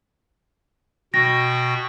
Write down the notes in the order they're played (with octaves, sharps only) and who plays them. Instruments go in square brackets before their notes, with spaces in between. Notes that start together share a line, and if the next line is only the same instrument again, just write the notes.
[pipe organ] B2 F#4 G5 [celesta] A#6